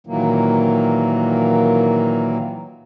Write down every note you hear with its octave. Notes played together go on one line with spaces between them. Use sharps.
A#2 D#3 E3 F#3 A#3